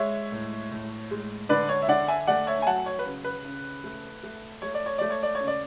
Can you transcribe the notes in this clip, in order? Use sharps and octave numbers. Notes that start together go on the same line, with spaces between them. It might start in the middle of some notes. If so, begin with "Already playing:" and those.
Already playing: G#3 C#5 E5
A2
A2
G#3
D3 B4 D5
C#5
E5
D3 D5 F#5
E5 G#5
A3 D5 F#5
C#5 E5
G#5
F#3 F#5 A5
C#5
B4
C#3
B4
C#3
A3
A3
A3 C#5
D5
C#5
A3 D5
C#5
D5
C#5
C#3
D5